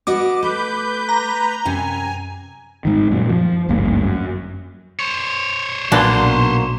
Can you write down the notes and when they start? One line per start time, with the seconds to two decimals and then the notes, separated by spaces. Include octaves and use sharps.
0.07 B3 F#4 D#5 D6
0.43 A3 B4 G6
1.09 A#5
1.65 F#2 C3 G#5
2.85 G#2 D#3
3.11 F#2 A#2 F#3
3.29 F3
3.69 G#1 D2 G2 A#3
4.03 F#2
5.00 C5 C#5
5.92 B1 A#2 F#3 A#3 D4 B4 C6